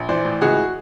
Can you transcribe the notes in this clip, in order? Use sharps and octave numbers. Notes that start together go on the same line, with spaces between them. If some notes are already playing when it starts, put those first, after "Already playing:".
Already playing: A#1
E3 C5 D5
A2
C#2 F#4 G#4